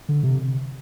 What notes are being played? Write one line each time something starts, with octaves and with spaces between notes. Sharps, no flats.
D3
C3